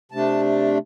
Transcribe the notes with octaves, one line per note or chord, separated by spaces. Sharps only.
C3 A3 D4 A5